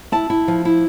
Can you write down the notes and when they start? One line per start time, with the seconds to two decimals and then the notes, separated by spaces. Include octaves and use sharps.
0.12 E4 A5
0.30 E4
0.48 F3
0.65 E4